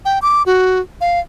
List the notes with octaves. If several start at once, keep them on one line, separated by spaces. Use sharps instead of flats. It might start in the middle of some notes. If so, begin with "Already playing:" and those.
G5
D6
F#4
F5